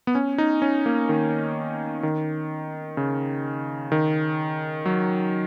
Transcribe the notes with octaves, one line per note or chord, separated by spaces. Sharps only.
B3
C#4
D#4
C#4
A#3
D#3
D#3
C#3
D#3
F#3